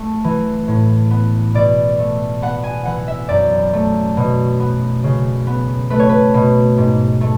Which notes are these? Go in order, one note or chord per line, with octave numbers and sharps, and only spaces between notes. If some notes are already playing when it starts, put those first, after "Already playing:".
Already playing: A3
E3
A2
B3
B2 D5
A3
B3 F#5
G#5
E3 F#5
E5
F#2 D5
A3
B2
B3
C#3
B3
A3 B4
C#5
B4
B2
G#2
A3